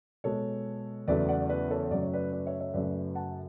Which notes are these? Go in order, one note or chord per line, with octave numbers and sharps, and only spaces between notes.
B2 G#3 A4 C#5
E2 C#3 F#3 A3 B4 D5
D5 F#5
B4 D5
A4 C#5
F#2 C#3 F#3 A3 D5
C#5
B4 D5
B4 D5
C#5 E5
C#5 E5
F#2 C#3 F#3 A3 B4 D5
F#5 A5